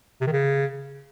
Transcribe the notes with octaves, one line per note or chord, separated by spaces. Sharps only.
C3
D#3
C#3